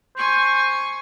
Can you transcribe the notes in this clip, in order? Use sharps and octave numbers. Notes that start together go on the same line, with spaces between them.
C5 G#5 C#6